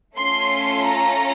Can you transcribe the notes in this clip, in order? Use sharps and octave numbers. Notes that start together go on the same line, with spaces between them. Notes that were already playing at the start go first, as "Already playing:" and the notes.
A3 C#4 F4 A4 C6
A#5